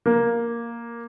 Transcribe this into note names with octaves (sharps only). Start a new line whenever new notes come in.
A#3